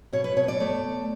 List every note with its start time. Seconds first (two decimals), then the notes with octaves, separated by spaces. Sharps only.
0.13 B2 C#5
0.24 B4
0.36 B2 C#5
0.48 D5
0.60 A3